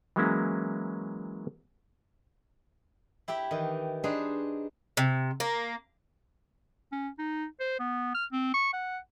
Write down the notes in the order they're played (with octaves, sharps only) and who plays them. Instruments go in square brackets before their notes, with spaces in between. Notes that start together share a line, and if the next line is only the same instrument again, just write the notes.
[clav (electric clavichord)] E3 F#3 G#3 A#3 C#4 E4
[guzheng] E4 G4 E5 G5
D#3 E3
D4 D#4 G#4 B4 C5
[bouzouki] C3
A#3
[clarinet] C#4
D#4
C5
B3
F6
C4
C#6
F#5